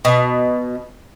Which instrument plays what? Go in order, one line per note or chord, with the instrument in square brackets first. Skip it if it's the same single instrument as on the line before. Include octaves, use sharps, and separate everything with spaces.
[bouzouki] B2